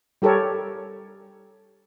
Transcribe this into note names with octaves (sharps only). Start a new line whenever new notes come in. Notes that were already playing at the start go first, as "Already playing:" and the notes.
G3 G4 A4 A#4 C#5